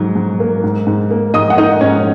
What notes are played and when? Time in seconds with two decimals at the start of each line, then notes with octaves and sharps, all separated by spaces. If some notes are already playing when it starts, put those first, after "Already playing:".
Already playing: G#2 F#3
0.15 G#2
0.40 A#3
0.64 G#2
0.87 G#2
1.11 A#3
1.34 G#2 D#5 D#6
1.50 F#5
1.57 A#3 D#4 D#5
1.81 G#2 C#4 C#5